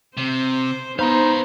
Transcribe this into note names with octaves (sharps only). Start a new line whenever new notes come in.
C3 C5
B3 D#4 B4 C5 F5 B5 C6